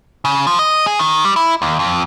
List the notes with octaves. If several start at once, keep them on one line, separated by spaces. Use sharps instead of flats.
C#3
F3
D#5
G#4
D#3
G3
E4
D#2
F2